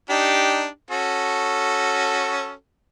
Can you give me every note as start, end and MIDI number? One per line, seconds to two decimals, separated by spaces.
0.10 0.67 62
0.10 0.67 63
0.10 0.67 67
0.91 2.53 61
0.91 2.53 66
0.91 2.53 69